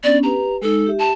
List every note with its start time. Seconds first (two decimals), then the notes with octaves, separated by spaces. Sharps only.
0.03 B3 C#4 D4 D5
0.23 G4 B4 A#5
0.62 G#3 D#4 A4
0.87 G4 E5
0.99 A5